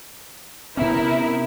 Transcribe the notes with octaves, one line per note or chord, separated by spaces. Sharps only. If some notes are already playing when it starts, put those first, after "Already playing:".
C3 B3 C#4 D#4 E4 A#4